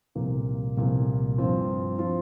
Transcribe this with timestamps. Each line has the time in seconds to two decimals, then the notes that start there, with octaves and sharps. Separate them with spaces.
0.15 C2 A#2 F3 A#3
0.77 C2 A#2 F3 A#3
1.38 G2 F3 C4 F4
1.98 F3 C4 F4